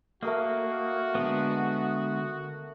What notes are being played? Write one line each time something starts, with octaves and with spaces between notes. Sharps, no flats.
A3 A#3 F#4 A#4 D#5
D3 G#3 B3